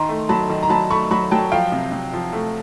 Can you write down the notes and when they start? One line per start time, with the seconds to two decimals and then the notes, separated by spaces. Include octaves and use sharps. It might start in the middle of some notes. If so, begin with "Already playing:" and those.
Already playing: D#3 A#5 C6
0.09 A3
0.29 F#3 A5 B5
0.50 D#3
0.63 A#5
0.69 F#3 A5 B5
0.90 A3 B5 C#6
1.11 F#3 B5 C#6
1.31 F#3 G5 A5
1.52 F3 F5 G5
1.72 C3
1.92 C3
2.13 F3
2.33 A3